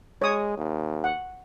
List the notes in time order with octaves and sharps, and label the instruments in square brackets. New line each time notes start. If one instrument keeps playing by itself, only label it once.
[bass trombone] G#3 [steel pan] C#5 D#6
[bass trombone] D#2
[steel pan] F#5